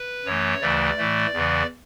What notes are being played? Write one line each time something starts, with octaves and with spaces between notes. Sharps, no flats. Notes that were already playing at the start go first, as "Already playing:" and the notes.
Already playing: B4
F#2 E3 A3 C#5
D2 C#3 E3 A3 D5
A2 E3 A3
E2 C#3 E3